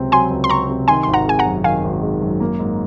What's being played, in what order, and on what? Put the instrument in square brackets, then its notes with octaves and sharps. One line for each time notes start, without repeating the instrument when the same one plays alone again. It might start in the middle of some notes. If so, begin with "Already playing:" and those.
Already playing: [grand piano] C#2 C3 F#3 C4
[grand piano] F#3 [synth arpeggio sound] G#5 C6
[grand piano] C#2
[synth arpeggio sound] C6
[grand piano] C4 [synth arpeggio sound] A#5 C#6
[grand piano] C3
[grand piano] D#3 [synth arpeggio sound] G#5 C6
[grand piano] G#1 [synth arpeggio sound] C6
[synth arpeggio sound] F#5 A#5
[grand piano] G#3 [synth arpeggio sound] G#5
[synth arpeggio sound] F#5 A#5
[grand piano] F#2
[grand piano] D#3 [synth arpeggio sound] F5 G#5
[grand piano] G#1
G#3
F#2
A#3
G#2